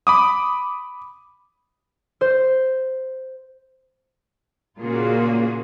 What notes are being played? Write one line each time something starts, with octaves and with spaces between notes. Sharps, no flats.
B5 D6 D#6
C5
A#2 C#3 A#3 F4 F#4 G#4